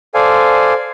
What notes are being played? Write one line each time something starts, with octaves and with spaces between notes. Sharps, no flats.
A4 C5 D5 F5 G#5